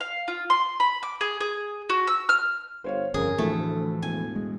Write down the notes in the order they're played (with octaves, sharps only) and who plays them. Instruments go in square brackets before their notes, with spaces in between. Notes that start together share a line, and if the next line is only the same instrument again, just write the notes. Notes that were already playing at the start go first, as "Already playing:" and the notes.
[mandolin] F5
F4
C6
B5
D6
G#4
G#4
F#4
E6
F6
[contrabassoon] G1 [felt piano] C5 C#5 F5
[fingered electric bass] G1 F2 [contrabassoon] C#3 [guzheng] G#4 [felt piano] A#4
[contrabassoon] D2 [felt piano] A2 [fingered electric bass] E3 F3 [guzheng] A3
[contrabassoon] E1 [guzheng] G#5
[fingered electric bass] G#3